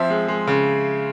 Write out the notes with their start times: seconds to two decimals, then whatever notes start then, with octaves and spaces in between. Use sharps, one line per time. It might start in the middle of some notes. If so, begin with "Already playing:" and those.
Already playing: F3 C4 E5
0.10 G#3
0.28 G#3
0.48 C#3